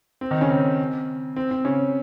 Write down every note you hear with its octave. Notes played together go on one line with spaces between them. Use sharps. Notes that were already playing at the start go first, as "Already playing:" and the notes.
C4
D#3 D#4
C#3 C#4
C4
C4
C4
C#3 C#4